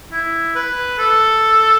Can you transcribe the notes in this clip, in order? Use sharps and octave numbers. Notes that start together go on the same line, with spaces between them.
E4
B4
A4